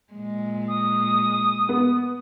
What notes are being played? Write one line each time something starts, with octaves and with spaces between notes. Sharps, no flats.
A#2 G#3
D#6
B3